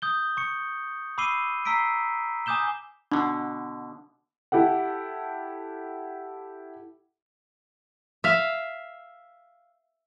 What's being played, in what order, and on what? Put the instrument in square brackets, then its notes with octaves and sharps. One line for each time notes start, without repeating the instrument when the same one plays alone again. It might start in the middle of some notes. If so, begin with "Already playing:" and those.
[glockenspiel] D#6 G6 G7
C#6 C#7
B5 D6 E6 C7 D#7 G7
A#5 E6 B6 C7 D7
G#5 D6 D#6 G6 E7 G7
[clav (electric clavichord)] B2 D3 [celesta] D4
[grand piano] E4 G4 A4 F#5
[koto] E5 F5